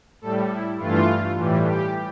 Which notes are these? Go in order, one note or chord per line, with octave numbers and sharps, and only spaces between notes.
A2 G3 A4
E4
G2 E3 A3 F4
A2 E3 G3
G4